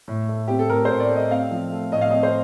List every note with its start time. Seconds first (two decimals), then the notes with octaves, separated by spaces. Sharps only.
0.08 A2
0.29 A3
0.48 C4 G4
0.59 A4
0.70 A2 A#4
0.85 A2 C5
1.00 D5
1.10 A3
1.16 D#5
1.31 C4 F5
1.51 F3
1.72 A3
1.92 A2 D#5
2.01 F5
2.10 C4 D#5
2.23 C5